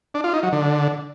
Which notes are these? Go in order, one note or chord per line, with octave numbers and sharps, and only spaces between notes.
D4
F4
D#4
F#3
D3